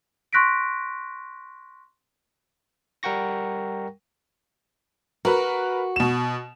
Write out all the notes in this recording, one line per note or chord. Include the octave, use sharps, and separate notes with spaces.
C6 C#6 F#6 A#6 B6 D7
G3 A#4 F#5 G5 C#6 A#6
F#4 A#4 B4 A#5
B2 E7